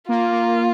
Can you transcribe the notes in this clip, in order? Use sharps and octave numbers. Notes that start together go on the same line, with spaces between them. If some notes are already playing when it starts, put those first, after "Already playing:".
A#3 F4
A#3